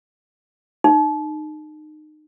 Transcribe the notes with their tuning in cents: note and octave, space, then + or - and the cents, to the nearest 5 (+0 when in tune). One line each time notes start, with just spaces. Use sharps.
D#4 -25